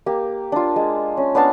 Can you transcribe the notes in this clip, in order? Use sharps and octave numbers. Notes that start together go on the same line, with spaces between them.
A#3 G4
D4 F4
G#3
C#4
B3 D4 F5 A5